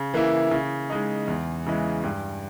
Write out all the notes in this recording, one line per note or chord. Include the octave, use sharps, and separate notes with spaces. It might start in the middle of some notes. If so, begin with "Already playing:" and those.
Already playing: C#3
E3 A#3 E4
C#3
G#3 D#4
E2
C#3 E3 G#3
G2